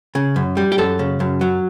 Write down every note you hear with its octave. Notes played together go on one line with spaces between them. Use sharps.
C#3
F#2
G3
G4
F#2 A4
C#3
F#2
F#3